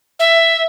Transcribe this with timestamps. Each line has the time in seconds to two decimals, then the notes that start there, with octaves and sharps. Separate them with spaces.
0.19 E5